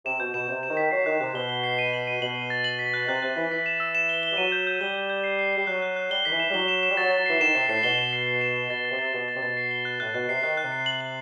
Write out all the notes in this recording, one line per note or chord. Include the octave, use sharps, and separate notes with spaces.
C3 E7
B2 G6
B2 E7
C3 G6
E7
D#3
B6
F#3 C7
D#3 F#6
C3 F#6
B2 G7
G7
C7
D#7
F#7
D#7
B2 F#7
D#7
A6
F#7
B6
F#6
C3 F#6
C3 F#6
E3 B6
E3 B6
E7
E6
E7
G7
G7
G3
F#3 D#7
G6
G6
G3 G7
G6
G6
C7
C7
G3 C7
F#3 F#6
F#6
F#6
G3 G7
D#3 B6
E3
E7
G3
F#3 G7
E7
E7
G3
F#3 A6
A6
F#3
E3 C7
D#3 E7
C3 C7
A2 C7
B2 G7
E7
C7
C7
E7
E7
B2 A6
A6
C3
A6
B2 A6
A6
C3
B2 A6
C7
G7
F#6
A2 F#6
B2 F#6
C3 C7
D#3 F#6
F#6
C3
C7
F#7
F#7